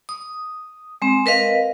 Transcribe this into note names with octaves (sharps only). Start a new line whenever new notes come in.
D#6
G#3 C4
A#4 B4 D#5 F5